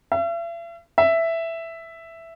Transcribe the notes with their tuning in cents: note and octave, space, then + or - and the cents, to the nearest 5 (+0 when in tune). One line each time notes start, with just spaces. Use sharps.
E5 +45
E5 +5